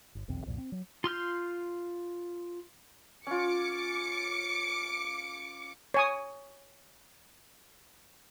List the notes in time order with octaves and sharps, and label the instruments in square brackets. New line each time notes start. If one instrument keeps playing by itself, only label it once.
[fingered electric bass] G1
F1 B1 E2 C4
C2 F2 A#2
C4
F#3
[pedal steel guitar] F4 C6 F6 G6
[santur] C#4 F4 [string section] D6 C#7
[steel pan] C#5 G#5 D#6